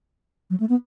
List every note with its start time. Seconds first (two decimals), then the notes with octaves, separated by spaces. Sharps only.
0.50 F#3
0.60 A3
0.69 B3